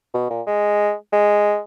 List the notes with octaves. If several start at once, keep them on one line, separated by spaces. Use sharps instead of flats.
B2
A#2
G#3
G#3